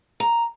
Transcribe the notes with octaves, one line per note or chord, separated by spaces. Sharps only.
A#5